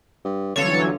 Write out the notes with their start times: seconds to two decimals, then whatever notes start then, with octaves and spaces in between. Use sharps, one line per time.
0.25 G2
0.56 G1 D3 E3 F#3 C#4 F4 A4 C#5